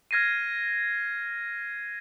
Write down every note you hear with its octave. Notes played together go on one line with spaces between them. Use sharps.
F6 G#6 A#6 C7 D#7